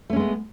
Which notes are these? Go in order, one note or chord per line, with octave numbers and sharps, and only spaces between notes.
G#3 A3 B3 C#4